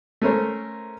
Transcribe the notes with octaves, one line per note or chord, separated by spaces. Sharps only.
A3 C#4 A#4 C5